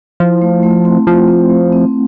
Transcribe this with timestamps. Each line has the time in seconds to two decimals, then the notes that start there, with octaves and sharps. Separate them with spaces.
0.20 F3 E4
0.42 A3
0.63 A3
0.85 C4
1.07 F3 A3
1.28 C4
1.50 A3
1.72 C4